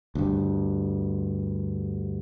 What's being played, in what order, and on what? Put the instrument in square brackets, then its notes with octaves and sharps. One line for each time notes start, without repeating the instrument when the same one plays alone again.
[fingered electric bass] D2 G2